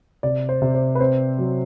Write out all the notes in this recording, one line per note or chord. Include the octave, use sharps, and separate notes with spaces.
C3 D5
C5
C3
C5
B4
C4 C5
F#3